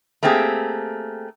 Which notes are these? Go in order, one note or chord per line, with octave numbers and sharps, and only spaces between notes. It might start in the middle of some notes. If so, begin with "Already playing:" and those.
A3 A#3 C4 G4 G#4